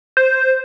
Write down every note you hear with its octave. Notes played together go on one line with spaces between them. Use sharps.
C5